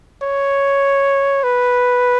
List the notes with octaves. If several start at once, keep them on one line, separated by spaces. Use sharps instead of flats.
C#5
B4